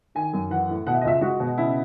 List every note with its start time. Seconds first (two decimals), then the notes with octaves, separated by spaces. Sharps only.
0.15 D#3 G#5
0.33 F#2
0.50 E3 F#5
0.69 A2
0.87 B2 F#5
0.94 E5
1.01 D#5
1.05 C#2 E5
1.21 G#3 F#4
1.40 B2
1.58 C#3 E4